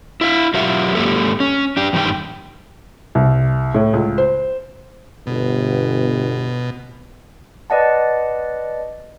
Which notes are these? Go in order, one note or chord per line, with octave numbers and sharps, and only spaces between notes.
E4 E5 F5
F#3 F4 G4 E5 F#5
G#2 C3 A#3 G4 A4
C#4
D4 G4
E2 G2 D#3 D#4 G4 G5
C2
A2
C#2
C5
G1 B2
B4 D5 D#5 F#5 A5